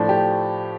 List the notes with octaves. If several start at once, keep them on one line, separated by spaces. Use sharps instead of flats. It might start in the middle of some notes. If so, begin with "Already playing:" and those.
Already playing: A2 F3 A3 D4
G4